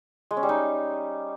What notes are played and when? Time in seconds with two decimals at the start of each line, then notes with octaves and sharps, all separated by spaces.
0.31 G#3
0.37 C#4
0.43 G3
0.49 D#4